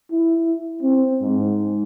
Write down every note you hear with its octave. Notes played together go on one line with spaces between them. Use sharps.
E4
C4
G#2